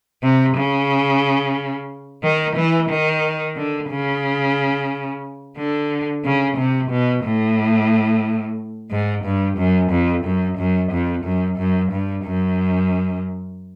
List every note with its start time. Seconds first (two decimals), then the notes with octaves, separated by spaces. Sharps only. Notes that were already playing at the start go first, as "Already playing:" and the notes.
0.23 C3
0.56 C#3
2.23 D#3
2.56 E3
2.89 D#3
3.57 D3
3.90 C#3
5.57 D3
6.24 C#3
6.57 C3
6.90 B2
7.24 A2
8.91 G#2
9.24 G2
9.58 F#2
9.91 F2
10.24 F#2
10.58 F#2
10.92 F2
11.24 F#2
11.58 F#2
11.92 G2
12.25 F#2